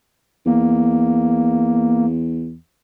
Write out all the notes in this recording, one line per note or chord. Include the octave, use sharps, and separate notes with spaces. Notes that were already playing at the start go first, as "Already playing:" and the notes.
E2 A#3